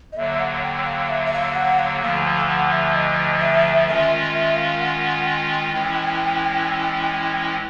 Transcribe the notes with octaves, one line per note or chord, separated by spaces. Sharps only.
D#5
D#2 D3 F#3 E5
F#5
G5
F5
E5
E5
F5
F#5
F5
D2 D3 F3 F5
F#5
E5
D#5
E5
D#3 G#3 C#4 F4 E5
E5
F5
F#5
G5
A2 E3 G#3 C#4 E4